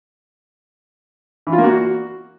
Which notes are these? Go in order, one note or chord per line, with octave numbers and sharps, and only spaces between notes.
E3
F4
A#3
F#4